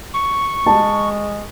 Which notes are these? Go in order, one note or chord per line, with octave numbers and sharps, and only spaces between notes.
C#6
G#3 A5